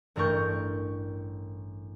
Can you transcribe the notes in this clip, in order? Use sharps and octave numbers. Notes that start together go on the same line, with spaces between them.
A1 G2 A3 A#4 C#6 G6